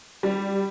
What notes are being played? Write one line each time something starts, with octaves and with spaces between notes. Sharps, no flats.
G3